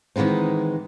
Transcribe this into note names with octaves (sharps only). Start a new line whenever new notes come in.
D#3 E3 G#3 B3 C4